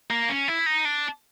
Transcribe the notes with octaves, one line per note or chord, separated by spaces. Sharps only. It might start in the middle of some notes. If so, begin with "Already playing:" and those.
A#3
C#4
E4
D#4
D4